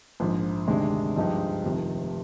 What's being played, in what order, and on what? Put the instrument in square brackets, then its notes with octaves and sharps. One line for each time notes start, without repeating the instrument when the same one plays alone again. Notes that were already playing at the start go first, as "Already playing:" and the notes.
[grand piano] A#1 G#2 F3
D2 C3 D#3 G#3 D4
G2 F3 G#3 D#4 G4
F1 F2 C3 D#3